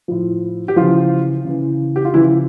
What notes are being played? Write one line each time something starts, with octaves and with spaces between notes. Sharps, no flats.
A2 F3
G4
C#3 E3 F3 F4
C#3 E3
G4
F4
C#3 E3 F3 E4